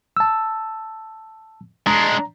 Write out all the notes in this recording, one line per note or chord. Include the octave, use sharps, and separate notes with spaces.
A5 E6
G#3 D4 A#5